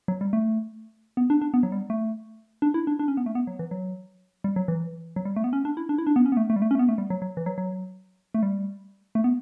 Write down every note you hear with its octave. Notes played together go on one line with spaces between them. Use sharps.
F#3
G3
A3
B3
D4
D4
B3
F#3
G3
A3
D4
E4
D4
D4
C#4
B3
A3
B3
F#3
E3
F#3
G3
F#3
E3
F#3
G3
A3
B3
C#4
D4
E4
D4
E4
D4
B3
C#4
B3
A3
A3
G3
A3
C#4
A3
B3
A3
G3
F#3
F#3
E3
F#3
F#3
A3
G3
A3
B3